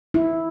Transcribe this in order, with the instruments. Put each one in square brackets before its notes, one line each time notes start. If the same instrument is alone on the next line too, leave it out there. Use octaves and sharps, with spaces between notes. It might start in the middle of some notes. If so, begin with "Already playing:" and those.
[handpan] E4